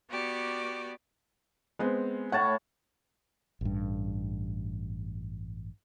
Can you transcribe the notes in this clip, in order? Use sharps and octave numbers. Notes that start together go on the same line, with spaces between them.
B3 F#4 G4 D5
G#3 B3 C4
A2 C#5 F#5 A5
A1 G2